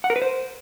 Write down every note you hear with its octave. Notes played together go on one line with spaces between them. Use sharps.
F#5
A#4
B4
C5